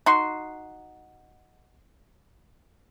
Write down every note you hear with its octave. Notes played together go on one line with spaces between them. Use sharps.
D#4 F#4 C6